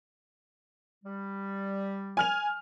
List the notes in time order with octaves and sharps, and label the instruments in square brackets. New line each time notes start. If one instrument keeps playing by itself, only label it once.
[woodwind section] G3
[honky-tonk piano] G#5 F6 F7